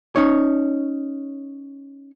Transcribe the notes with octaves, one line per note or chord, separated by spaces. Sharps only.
C#4 D#4 C#5